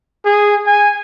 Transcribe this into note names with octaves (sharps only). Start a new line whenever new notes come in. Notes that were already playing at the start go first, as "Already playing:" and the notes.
G#4
G#5